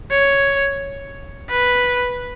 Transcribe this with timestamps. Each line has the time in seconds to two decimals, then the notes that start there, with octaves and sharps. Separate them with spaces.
0.11 C#5
1.50 B4